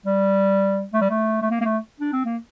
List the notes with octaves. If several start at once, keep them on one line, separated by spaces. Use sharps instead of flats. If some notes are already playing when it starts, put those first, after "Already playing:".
G3
A3
G3
A3
A3
A#3
A#3
A3
D4
C4
A#3